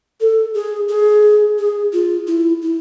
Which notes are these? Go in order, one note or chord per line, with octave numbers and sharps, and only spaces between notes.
A4
G#4
G#4
G#4
F4
E4
E4